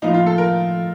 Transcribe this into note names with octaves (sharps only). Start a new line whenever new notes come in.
A2 F3 A#3 D#4
F4
A4
A#4